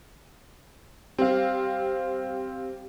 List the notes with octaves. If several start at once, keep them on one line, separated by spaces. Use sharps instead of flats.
G3 C4 F5